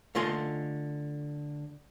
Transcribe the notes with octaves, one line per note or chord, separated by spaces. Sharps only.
D3 A3 F4 D#5 G#5 C6